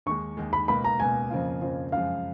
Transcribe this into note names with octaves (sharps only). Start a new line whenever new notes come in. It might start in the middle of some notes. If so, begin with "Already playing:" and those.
D#2 D#3 G#3 C#6
D#2 D#3 G#3
B5
C#2 B2 A#3 B5
A#5
C#2 B2 A#3 G#5
F2 C#3 F3 A#3 F4
F2 C#3 F3 A#3 F4
F#2 C#3 F3 G#3 F5